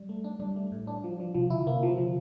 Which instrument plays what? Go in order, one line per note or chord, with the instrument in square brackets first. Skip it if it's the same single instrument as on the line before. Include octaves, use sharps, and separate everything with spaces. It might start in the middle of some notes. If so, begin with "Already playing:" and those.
Already playing: [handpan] G3
[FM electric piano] A3
D4
[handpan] G3 [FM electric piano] D4
[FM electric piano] A3
A2
D4
F3
F3
[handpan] C3 [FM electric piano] F3
[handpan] D3 [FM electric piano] E4
[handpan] C3 [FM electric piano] A#3
[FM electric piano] F3
[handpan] D3 [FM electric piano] F3